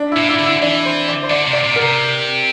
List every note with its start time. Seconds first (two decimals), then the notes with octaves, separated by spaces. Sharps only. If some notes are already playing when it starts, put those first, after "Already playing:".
Already playing: D4
0.12 A#2 E4
0.29 E4
0.39 D3
0.46 E4
0.62 E3 D4
0.85 C5
1.08 D5
1.23 C5
1.30 D3 D5
1.47 C3
1.53 D5
1.64 A#2
1.76 A#4
1.82 C3